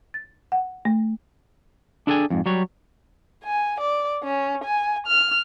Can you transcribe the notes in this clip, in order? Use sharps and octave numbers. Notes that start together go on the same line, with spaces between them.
A6
F#5
A3
D4 E4 G#4 A4 G5 G#5
F2 G#2
F#3 G3 F#4 C#5
G#5
D5
C#4
G#5
F6